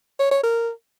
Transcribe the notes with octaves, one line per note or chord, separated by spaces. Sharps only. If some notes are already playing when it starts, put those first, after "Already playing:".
C#5
C#5
A#4